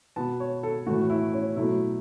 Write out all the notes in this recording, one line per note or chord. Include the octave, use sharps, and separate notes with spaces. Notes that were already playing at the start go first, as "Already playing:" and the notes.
B2 B3 A5
C#5
A4
A2 E3 A3 F#4
E4
C#4
B2 F#3 A3 E4